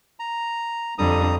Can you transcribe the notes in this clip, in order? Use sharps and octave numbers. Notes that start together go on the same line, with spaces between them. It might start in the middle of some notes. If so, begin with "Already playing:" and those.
A#5
F2 D3 G3 A#5 D#6